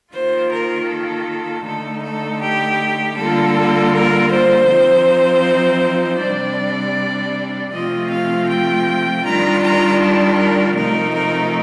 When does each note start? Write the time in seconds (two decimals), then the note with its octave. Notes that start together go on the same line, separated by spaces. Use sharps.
0.12 D#3 A#3 F4 C5
0.51 A#4
0.89 A4
1.65 D3 A3 D#4 A4
2.03 A4
2.41 G4
3.17 D3 G3 A#3 F4 A4
3.93 A#4
4.30 C5
4.68 F3 C4 D#4
6.20 C3 G3 D4 D5
7.72 C3 F3 A3 C4 F4 D#5
8.10 F5
8.48 G5
9.24 D#3 G3 D4 F4 A#5
9.61 A#5
9.99 A5
10.37 A#4
10.75 C3 F3 A3 D#4 A#4
11.14 A#4